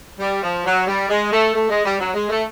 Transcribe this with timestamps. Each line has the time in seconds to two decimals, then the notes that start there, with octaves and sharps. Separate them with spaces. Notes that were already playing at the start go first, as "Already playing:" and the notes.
0.20 G3
0.42 F3
0.65 F#3
0.87 G3
1.09 G#3
1.33 A3
1.55 A3
1.70 G#3
1.85 G3
2.00 F#3
2.14 G#3
2.30 A3